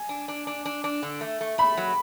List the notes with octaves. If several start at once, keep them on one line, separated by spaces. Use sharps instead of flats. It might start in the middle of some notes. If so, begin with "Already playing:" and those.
Already playing: G#5
D4
D4
D4
D4
D4
D3
A3
A3
A3 B5
F#3